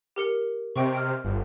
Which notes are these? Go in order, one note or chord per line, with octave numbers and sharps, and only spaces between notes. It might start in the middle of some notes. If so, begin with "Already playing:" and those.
G4 A#4 C#7
C3 D#5 G5 C#6
F6 D7
G1